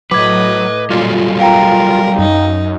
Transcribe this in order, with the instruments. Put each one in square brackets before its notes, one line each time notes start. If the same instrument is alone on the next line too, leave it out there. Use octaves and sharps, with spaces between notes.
[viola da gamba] A2 D#5 [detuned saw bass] F#3 [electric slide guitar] B4 [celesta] D6 G#6
[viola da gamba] A#2 [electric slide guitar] F#3 G3 A4 [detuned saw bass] F4
[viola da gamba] A#4 [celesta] F5 G5 A#5
[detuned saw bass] F#2 [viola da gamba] D#4